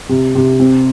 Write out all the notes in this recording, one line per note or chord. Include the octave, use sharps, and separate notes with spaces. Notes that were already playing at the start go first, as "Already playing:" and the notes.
C3
C3
C4